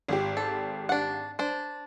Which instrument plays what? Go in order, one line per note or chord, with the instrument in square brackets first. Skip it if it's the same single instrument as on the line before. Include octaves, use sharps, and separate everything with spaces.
[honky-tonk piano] G#1 G4
[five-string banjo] A4
D4 F#5
D4 C5